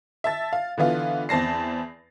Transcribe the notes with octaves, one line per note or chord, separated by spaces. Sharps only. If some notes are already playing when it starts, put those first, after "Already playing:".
E5 A5 A6
F5
D3 E3 B3 F4
E2 C4 A5 A#6 C7